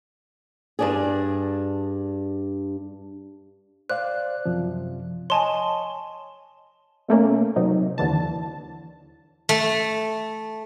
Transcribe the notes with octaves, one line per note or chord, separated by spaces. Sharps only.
G2 D4 G#4
C5 D5 F5 F#6
F#2 C3 F3
C#5 D#5 G#5 A5 C6
B2 A3 A#3 C#4
C3 F#3 D#4
D#2 D3 E3 A5
A3